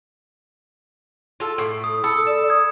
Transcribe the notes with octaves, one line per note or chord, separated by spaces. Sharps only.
F4 A4
A2
D#6
A4 B5 E6 C#7
D5 E7
D#6 G#6